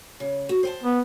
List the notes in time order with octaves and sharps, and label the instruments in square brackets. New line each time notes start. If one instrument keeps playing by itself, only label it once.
[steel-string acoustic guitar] C#3
F#4
C5 F#5 A5
[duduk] B3